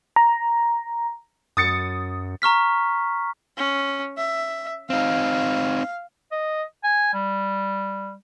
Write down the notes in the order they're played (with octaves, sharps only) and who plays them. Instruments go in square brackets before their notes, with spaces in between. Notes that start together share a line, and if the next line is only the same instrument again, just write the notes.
[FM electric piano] A#5
[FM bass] F#2 [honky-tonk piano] D#6 A6 C#7
[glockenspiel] A#5 C#6 F6 B6
[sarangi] C#4
E5
[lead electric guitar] C4 D#4 [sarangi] F5
[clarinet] D#5
G#5
G3